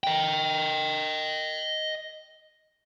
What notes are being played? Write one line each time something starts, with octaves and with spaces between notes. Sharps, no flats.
D#5 G5